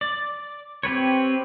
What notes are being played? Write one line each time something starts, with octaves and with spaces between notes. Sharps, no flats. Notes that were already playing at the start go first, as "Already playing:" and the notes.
D5
C4 G4 B4 C#5